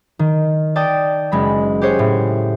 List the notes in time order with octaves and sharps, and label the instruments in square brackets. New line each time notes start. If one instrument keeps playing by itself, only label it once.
[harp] D#3
D5 G5 A5 D#6
F#1 G#3 B5
G4 G#4 C5 C#5 F#5
A2